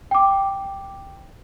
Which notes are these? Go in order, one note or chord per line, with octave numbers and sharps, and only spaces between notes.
G5 D6